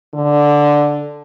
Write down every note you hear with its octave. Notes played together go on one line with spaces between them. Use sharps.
D3